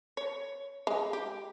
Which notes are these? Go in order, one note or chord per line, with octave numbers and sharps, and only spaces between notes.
C#5
G#3
G4